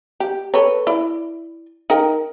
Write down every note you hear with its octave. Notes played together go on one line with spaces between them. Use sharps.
G4
A4 B4 C#5
E4 D5
D#4 A#4 G5